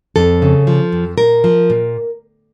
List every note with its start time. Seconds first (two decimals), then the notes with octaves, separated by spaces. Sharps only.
0.16 F2 A4
0.42 C#3
0.67 F3
0.92 F2
1.18 A#2 A#4
1.44 F3
1.70 A#2